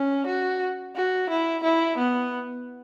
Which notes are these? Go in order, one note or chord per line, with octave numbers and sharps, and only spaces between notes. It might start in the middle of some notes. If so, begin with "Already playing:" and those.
Already playing: C#4
F#4
F#4
E4
E4
B3